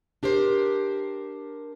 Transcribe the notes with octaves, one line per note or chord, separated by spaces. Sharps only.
D4 G4 A#4 C5